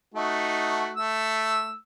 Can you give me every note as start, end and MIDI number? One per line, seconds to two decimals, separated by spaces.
0.14 0.91 57
0.14 0.91 63
0.14 0.91 66
0.97 1.75 57
0.97 1.75 88